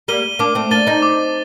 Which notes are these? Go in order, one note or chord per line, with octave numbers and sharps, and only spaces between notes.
G3 A#3 D#7 G7
A#3 D4 D6
A3 C4
A#3 D4 A6 D#7 G7
C4 D#4
D6